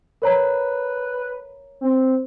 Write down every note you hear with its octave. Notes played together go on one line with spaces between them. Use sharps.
A#4 B4 C#5 A#5
C4